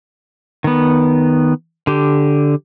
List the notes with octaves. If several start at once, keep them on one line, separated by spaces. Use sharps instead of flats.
D#3 B3
D3 G4